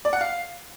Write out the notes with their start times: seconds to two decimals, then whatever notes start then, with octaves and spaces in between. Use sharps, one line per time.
0.05 D5
0.13 F#5
0.21 F5